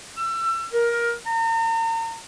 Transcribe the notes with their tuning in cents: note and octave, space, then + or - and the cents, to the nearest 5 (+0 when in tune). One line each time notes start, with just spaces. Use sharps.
E6 +30
A#4 +15
A#5 -40